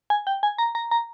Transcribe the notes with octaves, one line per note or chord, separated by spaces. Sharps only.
G#5
G5
G#5
A#5
A#5
A#5